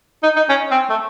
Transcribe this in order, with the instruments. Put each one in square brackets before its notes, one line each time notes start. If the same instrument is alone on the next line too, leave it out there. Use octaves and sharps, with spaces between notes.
[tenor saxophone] D#4
D#4
C#4
C4
A3